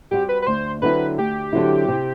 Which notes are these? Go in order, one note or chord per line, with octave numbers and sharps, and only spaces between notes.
G3 C4 F#4 G4
B4
B4
D2 C5
D3 F#3 C4 E4 B4
D2 G4
D3 F#3 C4 E4
C3